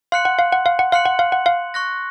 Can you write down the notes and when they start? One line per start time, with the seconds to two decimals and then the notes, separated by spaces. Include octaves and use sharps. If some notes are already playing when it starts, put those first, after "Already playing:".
0.12 F5 C6 F#6 C#7 F#7
0.25 F#5
0.39 F5
0.52 F#5
0.66 F5
0.79 F#5
0.92 F5 C6 F#6 C#7 F#7
1.06 F#5
1.19 F5
1.32 F#5
1.46 F5
1.74 C#6 F#6 A#6